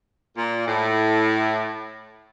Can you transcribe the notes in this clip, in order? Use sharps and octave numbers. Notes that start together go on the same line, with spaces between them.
A#2
A2